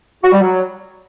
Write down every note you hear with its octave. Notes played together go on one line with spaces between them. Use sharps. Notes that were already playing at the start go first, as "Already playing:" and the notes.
F#4
G3
F#3